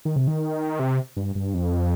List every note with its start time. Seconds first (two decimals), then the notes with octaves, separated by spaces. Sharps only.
0.05 D#3
0.16 C3
0.27 D#3
0.79 C3
1.17 G2
1.35 G2
1.54 F2